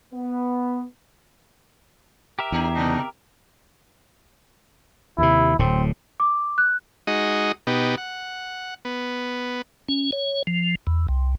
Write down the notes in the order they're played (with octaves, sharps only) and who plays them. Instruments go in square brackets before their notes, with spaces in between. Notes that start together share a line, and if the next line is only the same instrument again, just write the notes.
[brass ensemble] B3
[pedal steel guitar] G4 A#4 E5
[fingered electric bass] E2 [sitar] D4 D#4 G#4
[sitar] G#2 C3 B3 [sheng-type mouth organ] D4 D#4 D#5
[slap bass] D#2 C3 [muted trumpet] E4
[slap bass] D1 A2 [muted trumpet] C4
[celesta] D6
F#6
[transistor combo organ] G#3 D#4 F#4 D#5
B2 B3 D#4 G4
F#5
B3
[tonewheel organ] C#4
C#5
F3
E2
C2